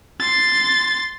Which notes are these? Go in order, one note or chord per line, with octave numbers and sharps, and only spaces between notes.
C6 A6